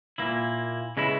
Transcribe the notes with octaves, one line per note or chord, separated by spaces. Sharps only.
A#2 A#3 E4
C#3 G#3 B3 E4